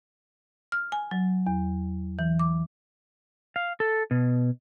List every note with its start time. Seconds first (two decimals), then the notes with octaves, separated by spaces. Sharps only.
0.72 F6
0.92 G#5
1.11 F#3
1.47 E2
2.19 E3
2.39 D6
3.56 F5
3.80 A4
4.11 B2